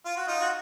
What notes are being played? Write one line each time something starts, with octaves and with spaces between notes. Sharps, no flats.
F4
F#4
D#4 F4
F#4